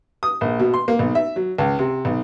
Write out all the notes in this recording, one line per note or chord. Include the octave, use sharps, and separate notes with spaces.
D#6
A#1
B2
C6
A#3
B1
E5
F#3
C#2
C3
B1